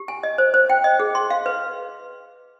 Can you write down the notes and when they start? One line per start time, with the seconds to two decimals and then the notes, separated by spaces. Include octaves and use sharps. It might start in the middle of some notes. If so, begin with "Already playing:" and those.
Already playing: G4
0.08 G#5
0.23 D#5
0.38 C5
0.54 C5
0.70 G5
0.84 D#5
1.00 G#4
1.15 C6
1.30 F5
1.46 B4